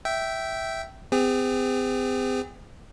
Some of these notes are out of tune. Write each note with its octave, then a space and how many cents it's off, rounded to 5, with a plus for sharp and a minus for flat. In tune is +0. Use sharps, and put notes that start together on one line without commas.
E5 +0 G5 -15
C4 -40 G#4 -40